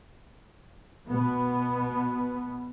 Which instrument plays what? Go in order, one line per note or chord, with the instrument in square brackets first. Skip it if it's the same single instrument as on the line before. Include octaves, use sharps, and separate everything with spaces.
[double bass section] B2 B3